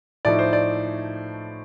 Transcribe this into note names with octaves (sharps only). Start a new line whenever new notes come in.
A2 F3 A3 D#4 D5
C5
D5